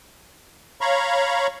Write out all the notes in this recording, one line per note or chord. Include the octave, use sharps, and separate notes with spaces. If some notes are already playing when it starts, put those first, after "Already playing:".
C#5 F5 A#5 B5 C#6